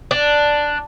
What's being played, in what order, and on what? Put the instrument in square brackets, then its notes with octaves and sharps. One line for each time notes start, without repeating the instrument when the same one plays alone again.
[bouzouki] D4